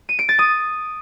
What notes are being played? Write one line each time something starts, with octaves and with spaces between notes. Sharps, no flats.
D#7
D7
A6
D#6